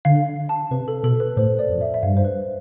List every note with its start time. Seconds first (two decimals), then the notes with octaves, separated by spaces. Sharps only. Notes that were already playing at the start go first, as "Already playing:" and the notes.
0.05 D3 F5
0.49 A5
0.71 C3 B4
0.88 A4
1.03 B2 A4
1.20 B4
1.37 A2 C5
1.59 D5
1.69 F2
1.81 E5
1.94 E5
2.03 G2 F5
2.17 C5
2.25 B4